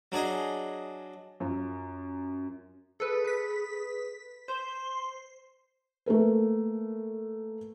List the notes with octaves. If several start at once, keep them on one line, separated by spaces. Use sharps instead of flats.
F#3 D4 G#4 D#5
F#2 F4
G#4 A4 B4
B4 B6
C5 C6
A3 A#3 A#4 B4